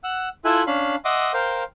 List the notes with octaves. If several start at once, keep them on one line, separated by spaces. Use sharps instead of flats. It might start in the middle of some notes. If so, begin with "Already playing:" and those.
F#5 E6 F#6
E4 F4 A4 E5 G#5 F#6
C#4 D4 F5 B5
D#5 E5 F#5 C6 D6 D#6
A#4 C5 F5 G5